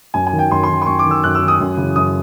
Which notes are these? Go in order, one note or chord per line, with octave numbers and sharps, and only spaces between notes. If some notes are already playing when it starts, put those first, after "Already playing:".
F#2 G#5
G#5
D#3
G5
F#2 C6
C6
D#3
C6
F#2 C#6
D6
D#3
E6
F#2 F#6
E6
D#3
D#6
F#2
C#3 E3
F#2 D#6